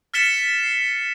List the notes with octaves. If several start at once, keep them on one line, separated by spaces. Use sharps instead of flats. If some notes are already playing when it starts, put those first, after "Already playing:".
F6 A6 B6 C#7 E7 G7
C7